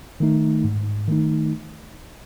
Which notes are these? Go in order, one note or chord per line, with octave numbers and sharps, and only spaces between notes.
D#3 A3 D#4
G#2
D#3 A3 D#4